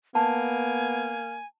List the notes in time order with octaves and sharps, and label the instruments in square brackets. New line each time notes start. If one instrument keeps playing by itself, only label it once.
[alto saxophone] A#3 [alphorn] B3 [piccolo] G#5 [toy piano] A5